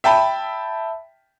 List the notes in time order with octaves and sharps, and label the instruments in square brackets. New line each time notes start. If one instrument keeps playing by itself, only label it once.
[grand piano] E5 G5 A5 B5